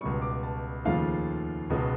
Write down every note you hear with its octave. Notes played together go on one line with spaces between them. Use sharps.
C#2 B2 G3 C#6
D6
A5
D#2 C#3 F3 A3 F5
C#2 B2 G#3